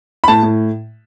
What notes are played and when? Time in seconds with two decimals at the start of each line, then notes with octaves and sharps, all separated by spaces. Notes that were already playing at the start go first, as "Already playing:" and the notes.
0.24 B5
0.28 A2 A5
0.43 A2